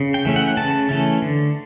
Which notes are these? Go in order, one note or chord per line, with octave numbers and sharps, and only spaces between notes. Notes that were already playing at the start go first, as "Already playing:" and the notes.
Already playing: C#3
G5
E3 A3 C#4
F#5
C#3 A5
E3 A3 C#4
D3